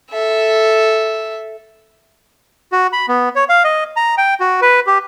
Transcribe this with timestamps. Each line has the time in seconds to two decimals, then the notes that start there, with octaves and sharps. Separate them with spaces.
0.11 A4 E5
2.72 F#4
2.93 B5
3.08 B3
3.35 C#5
3.49 F5
3.64 D#5
3.96 A#5
4.18 G5
4.40 F#4
4.62 B4
4.87 G4